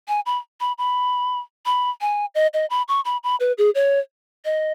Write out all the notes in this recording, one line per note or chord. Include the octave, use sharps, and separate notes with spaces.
G#5
B5
B5
B5
B5
G#5
D#5
D#5
B5
C#6
B5
B5
B4
G#4
C#5
D#5